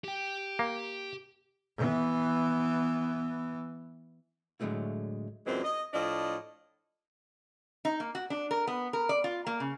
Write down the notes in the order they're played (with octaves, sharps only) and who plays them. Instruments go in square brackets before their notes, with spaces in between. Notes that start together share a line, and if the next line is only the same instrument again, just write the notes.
[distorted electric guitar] G4 G5
[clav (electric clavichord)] A#3
[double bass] E3 B3
[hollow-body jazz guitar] A2 D3 F#3 G#3 A3 E4
[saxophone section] F#2 A#2 E3 F#3 G#3 C4
D#5
A2 F3 D4 D#5
[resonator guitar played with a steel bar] D#4
A#3
F#4
D4
A#4
B3
A#4
D5
F4
A#3
C#3